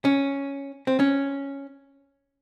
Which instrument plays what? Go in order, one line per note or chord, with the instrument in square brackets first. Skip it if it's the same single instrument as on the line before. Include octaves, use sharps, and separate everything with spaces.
[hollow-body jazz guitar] C#4
C4
C#4